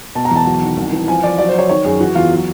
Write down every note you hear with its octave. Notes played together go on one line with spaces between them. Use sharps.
B2 A5
A#5
E2 A5
F#3
D#3
C2
E3
F3 G#5
F3 D5
F#3 D5
C5
F#3 C#5
D#3 C#5
F#2 G#4
E3 F#4
E2 F4
F#3